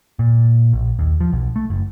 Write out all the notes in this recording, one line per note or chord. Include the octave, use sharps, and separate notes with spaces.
A#2
A#1
D#2
F3
B1
A3
F#1